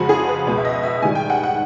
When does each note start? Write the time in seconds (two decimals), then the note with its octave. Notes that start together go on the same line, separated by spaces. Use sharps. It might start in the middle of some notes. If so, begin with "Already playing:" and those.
Already playing: F2 C#3 F3 G#3 F#4
0.09 G#4
0.28 B4
0.47 C#2 B2 G#3
0.58 E5
0.65 D#5
0.83 E5
1.02 G#2 D#3 G3 G#5
1.15 G5
1.30 F#5
1.43 F#5